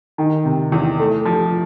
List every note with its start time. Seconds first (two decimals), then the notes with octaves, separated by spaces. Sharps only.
0.18 D#3
0.45 C3
0.72 E2
0.99 A3
1.25 F3